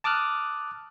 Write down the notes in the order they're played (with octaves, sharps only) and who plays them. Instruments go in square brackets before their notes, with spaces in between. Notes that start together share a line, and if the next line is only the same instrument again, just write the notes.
[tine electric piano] A5 D6 D#6 F6 F#6